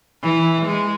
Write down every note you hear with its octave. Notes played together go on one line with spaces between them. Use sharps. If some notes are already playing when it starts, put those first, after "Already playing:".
E3
G#3